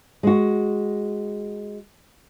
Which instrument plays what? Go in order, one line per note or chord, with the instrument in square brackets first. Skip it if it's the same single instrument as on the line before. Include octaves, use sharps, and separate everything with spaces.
[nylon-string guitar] G#3 F#4